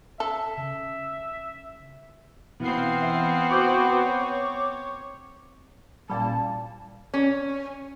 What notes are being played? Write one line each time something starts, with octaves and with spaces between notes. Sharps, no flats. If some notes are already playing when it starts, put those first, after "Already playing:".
A4 E5
C#3
B2 E3 B3 C4 F5 C7
E5
F#4 B4 C5 C#6 D6 G6
C#5
A1 A#2 G3 A5
C#4